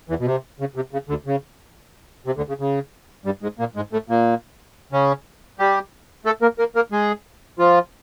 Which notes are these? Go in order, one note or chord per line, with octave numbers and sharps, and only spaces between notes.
E2 E3
B2
C3
C#3
C3
C#3
D2 D3
C#3
C3
D2 D3
C#3
C#3
G2 G3
G#2 G#3
A#2 A#3
G#2 G#3
A2 A3
A#2 A#3
C#3 C#4
G3 G4
A3 A4
A#3 A#4
A#3 A#4
A#3 A#4
G#3 G#4
F3 F4